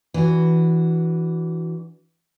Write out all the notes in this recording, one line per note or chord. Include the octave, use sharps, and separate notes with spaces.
E3 D4 F#4